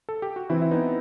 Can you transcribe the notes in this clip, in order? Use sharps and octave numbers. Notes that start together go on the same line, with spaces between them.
A4
G4
F#4
E3 C4 E4
E4
B3 D#4